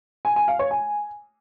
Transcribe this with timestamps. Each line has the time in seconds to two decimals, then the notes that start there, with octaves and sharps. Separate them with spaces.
0.25 G#5
0.36 G#5
0.48 F5
0.59 C#5
0.71 G#5